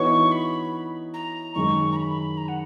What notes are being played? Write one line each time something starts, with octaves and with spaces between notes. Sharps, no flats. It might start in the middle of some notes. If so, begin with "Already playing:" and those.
Already playing: E3 B3 D#4 F#4 C#5 C#6
B5
A#5
F#2 D#3 G#3 C#6
A#5
B5
A#5
F#5